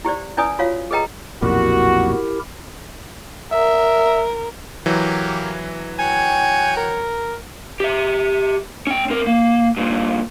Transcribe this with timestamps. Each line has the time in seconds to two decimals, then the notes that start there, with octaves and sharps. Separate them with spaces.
0.05 E4 G4 C5 D5
0.37 C#4 E4 B4 D5 G#5 D#6
0.59 F4 F#4 C#5 F5
0.91 G#4 A4 B4 D#5 G5 A#5
1.42 B1 F2 A#2 E4 F#4 G4 A#4
3.52 A#4 E5
4.86 E3 F#3 A#3 G4
5.99 F#4 C#5 G5 G#5
6.77 A#4
7.80 G4 E5
8.87 C#4 G5
9.10 C4 A#4
9.27 A#3
9.77 G2 A#2